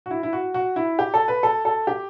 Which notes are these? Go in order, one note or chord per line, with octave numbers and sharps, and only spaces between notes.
F#4
E4
E4
F#4
F#4
E4
G4
A4
B4
A4
A4
G4